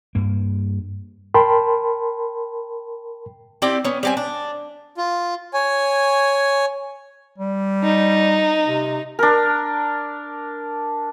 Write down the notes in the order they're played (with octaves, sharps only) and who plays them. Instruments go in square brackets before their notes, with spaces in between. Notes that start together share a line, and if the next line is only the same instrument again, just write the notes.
[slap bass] G2 A#3
[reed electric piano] A#4 G5 A5 B5 C6
[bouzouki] C4 E4 G4 D5
B3 C#4
G3 C4 G#5
D4
[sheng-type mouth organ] F4
C#5 G#5
[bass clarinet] G3
[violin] D#4
[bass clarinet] C3
[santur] D4 A#4